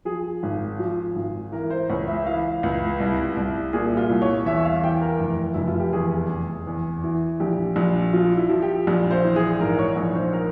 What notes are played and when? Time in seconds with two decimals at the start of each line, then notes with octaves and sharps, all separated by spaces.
0.05 F3 G#4
0.43 G#1
0.79 F3
1.16 G#1
1.52 E3 A#4
1.70 C5
1.90 C#2 C#5
2.08 E5
2.26 E3 F5
2.63 C#2
3.00 C2
3.37 C2
3.73 A#2 G#4
3.97 F4
4.10 C2
4.22 C#5
4.46 E2 E5
4.65 F5
4.83 E3 G5
5.01 A#4
5.19 F1
5.54 F1 E4
5.68 F4
5.80 G4
5.93 E2 G#4
6.29 F1
6.67 E2
7.04 E3
7.40 A#1 G4
7.76 A#1
8.13 F3 F4
8.37 E4
8.49 F3
8.62 G4
8.87 A#1
9.11 C5
9.24 E3
9.36 G#4
9.60 G#2 A#4
9.79 C#5
9.96 A#1
10.15 C5
10.33 A#4